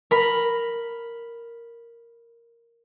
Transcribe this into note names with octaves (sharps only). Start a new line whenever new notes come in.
A#4 B5